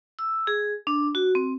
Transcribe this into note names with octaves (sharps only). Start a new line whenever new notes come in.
E6
G#4
D4
F#4
C4